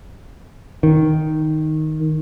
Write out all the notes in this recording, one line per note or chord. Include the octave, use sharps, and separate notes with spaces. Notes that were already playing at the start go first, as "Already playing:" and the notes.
D#3